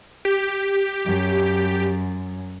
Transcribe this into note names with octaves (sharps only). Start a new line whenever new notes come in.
G4
F#2